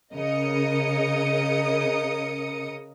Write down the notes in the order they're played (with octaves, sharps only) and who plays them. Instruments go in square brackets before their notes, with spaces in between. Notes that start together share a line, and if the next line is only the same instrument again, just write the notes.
[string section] C#3 A#4 D#5 D#6 C#7